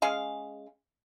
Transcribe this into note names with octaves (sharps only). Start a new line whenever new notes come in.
G#3 C#4 G#4 F5